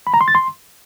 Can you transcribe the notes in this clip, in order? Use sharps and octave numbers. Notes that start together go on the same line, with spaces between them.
B5
A#5
C6
A6
C6